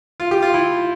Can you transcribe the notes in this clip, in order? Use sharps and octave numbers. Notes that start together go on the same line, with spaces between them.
F4
G4
F4
E4